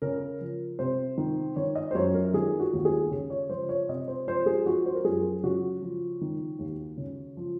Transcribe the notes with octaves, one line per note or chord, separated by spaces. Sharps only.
C#3 A#4
F3
C3 C5
D#3
D#3 C#5
D#5
C5
F#2 C#5
A#4
D#3 G#4
F#4
D#2
G#4
C#3
C#5
F3 C5
C#5
C3 D#5
C5
F3 C5
G#4
F3 F#4
C5
A#4
F#2 G#4
C#3 F#4
F3
D#3
D#2
C#3
F3